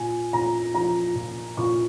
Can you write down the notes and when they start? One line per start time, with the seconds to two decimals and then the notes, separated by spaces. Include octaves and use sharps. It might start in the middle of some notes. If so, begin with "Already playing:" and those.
Already playing: A#2 G#5
0.33 A#2 A#5
0.75 F3 A#5
1.15 A#2
1.57 A#2 C#6